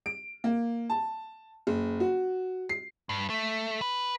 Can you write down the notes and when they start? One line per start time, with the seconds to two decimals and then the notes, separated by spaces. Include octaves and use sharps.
0.06 D7
0.44 A#3
0.90 A5
1.67 F#1
2.00 F#4
2.69 C7
3.09 G2
3.30 A3
3.81 B4